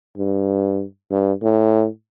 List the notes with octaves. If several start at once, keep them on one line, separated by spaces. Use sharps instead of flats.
G2
G2
A2